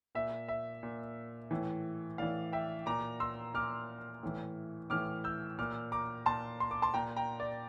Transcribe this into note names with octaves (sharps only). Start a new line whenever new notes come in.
A#2 E5
E5
A#2
A2 E3
A2 E3 D5 F5
E5 G5
A#2 A#5 D6
C6 E6
A#2 D6 F6
A2 E3
A2 E3 D6 F6
E6 G6
A#2 D6 F6
A#5 D6
A#2 A5 C6
C6
D6
A5 C6
A#2 G5 A#5
G5 A#5
D5